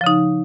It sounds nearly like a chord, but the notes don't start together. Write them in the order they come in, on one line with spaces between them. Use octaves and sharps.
F3 C#3 D#4